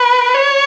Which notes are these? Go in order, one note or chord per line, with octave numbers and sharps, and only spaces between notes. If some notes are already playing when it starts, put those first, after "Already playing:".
Already playing: B4
C#5